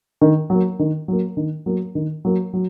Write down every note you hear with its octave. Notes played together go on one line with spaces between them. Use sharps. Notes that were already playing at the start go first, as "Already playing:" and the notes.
D#3
F#3 A#3
D#3
F#3 A#3
D#3
F#3 A#3
D#3
F#3 A#3
F#3